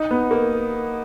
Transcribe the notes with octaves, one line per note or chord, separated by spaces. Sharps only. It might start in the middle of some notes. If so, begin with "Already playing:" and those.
Already playing: D#4
B3
A#3